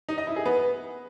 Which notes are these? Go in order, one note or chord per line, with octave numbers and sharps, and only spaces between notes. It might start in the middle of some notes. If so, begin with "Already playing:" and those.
D#4
D#5
E4
G#4
B3